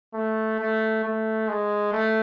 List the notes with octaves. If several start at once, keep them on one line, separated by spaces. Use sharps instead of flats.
A3
A3
A3
G#3
A3